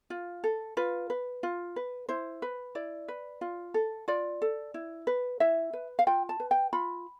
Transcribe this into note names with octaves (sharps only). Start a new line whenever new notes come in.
F4
A4
F4 B4
B4
F4
B4
E4 C5
B4
E4 D5
B4
F4
A4
F4 D5
A4
E4
B4
E4 E5
B4
F5
F4 G5
A5
B4
G5
F4 B5